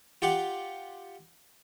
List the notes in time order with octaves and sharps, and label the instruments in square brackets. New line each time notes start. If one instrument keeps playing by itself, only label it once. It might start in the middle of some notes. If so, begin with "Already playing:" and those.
[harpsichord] F4 G4 F#5